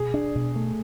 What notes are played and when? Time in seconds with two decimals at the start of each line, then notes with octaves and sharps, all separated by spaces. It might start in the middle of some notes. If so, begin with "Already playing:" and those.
Already playing: B2 G#4
0.14 D4
0.35 B2
0.56 A3